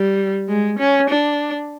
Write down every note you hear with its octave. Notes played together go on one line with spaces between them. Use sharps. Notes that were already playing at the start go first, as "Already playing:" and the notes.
Already playing: G3
G#3
C#4
D4